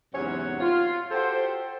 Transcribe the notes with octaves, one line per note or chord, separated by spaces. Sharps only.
E2 G#2 C3 F#3 C#4 C#5
F4
F#4 G4 A4 C5